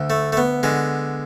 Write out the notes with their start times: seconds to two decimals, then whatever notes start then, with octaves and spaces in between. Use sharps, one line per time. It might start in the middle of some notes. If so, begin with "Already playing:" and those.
Already playing: D2 D3
0.10 A3
0.33 A3
0.37 B3
0.63 D3 G#3